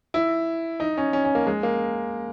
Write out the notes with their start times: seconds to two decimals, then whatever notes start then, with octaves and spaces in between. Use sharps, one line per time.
0.14 E4
0.80 D#4
0.98 C#4
1.13 C#4
1.25 C#4
1.35 A#3
1.47 G#3
1.63 A#3